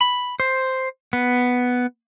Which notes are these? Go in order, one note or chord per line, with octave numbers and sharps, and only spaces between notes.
B5
C5
B3